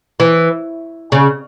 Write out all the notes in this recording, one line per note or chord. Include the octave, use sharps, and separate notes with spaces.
E3
C#3